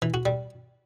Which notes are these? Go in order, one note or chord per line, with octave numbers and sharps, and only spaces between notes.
E3
F#4
G3